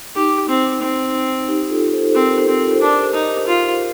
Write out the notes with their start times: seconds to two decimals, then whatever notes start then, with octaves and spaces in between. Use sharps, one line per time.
0.15 D#4 G4
0.49 C4
0.82 C4
1.48 D#4 G4
1.70 F4 A4
1.93 A4 C5
2.09 C5
2.14 C4 G4 A#4
2.37 G4 A#4
2.48 C4
2.58 F4 A4
2.75 C5
2.80 D4 G4 A#4
3.14 D#4
3.47 F4